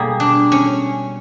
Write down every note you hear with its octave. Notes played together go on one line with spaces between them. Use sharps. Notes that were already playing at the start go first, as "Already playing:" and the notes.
Already playing: B2 G3 A#3 G#4
D4
C#4